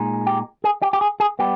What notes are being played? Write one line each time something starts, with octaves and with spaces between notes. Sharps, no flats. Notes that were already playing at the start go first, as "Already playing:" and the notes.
Already playing: A#2 G#3 D#4
G4
G#4
G4
G4
G#4
G#4
G3 B3 G4